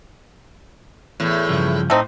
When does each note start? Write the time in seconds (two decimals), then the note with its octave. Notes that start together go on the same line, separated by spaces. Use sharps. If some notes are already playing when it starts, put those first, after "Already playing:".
1.20 E2 A2
1.49 G2 C#3 F3
1.90 A2 A3 C4 D#4